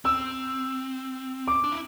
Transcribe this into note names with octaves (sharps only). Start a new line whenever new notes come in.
C4 E6
D6
D4
E4